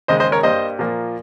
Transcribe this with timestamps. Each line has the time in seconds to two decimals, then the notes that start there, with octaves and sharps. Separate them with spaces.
0.08 D#2 C#3 G#3 C5 D#5
0.20 C5 D#5
0.32 A#4 C#5
0.43 G2 G3 A#3 C5 D#5
0.79 A#2 F3 A#3